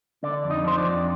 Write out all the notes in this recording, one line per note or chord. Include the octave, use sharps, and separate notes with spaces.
D3 D4 D5
F2
D#4 D#5
F3 C5
D4 D5
F2